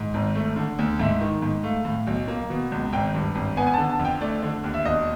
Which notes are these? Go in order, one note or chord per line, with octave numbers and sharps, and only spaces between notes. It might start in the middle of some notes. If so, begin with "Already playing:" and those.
Already playing: G#2
G#1
A3
D3
D2
G#2 E5
D#3
G#2
A3 F5
A2
B1
A#3
B2
C#2
G#1 G5
G2
G#1
B3 G#5
G#5
A5
D3
A5
F2
G5
A3 D5
D3
D#2
E5
E1 D#5